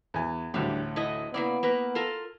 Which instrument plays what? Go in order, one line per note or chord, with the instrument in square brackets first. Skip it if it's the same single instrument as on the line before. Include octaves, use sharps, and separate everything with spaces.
[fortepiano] E2 G#5
[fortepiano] A1 D2 A2 [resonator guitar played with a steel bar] G3 D4
[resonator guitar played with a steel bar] E4 A4 D#5
[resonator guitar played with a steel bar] C#3 A#3 D5 [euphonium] B3 [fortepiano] E4
[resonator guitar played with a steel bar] A#3 A#4 B4
F4 A4 A#4